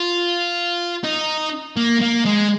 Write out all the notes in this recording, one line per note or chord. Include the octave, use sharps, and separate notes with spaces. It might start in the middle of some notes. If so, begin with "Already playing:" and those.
Already playing: F4
D#4
A#3
A#3
G#3